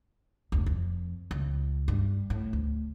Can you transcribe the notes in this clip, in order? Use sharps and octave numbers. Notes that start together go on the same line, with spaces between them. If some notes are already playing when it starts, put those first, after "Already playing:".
F1 D2
F2
C#2
G2
A2
D2